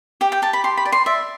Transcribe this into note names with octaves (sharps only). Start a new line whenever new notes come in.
G4 G5
G5
G4 A5
B5
G4 C6
B5
D5
C6
D5 E5